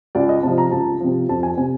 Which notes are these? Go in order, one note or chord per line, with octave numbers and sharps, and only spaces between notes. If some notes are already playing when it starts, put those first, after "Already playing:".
C#2 D5
D#5
C3 F3 A5
A#5
C#2 A5
C3 F3
F2 A5
G#5
C3 G#5